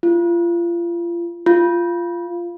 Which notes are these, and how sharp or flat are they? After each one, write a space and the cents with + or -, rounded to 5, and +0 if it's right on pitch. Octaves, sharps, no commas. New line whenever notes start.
F4 -30
F4 -10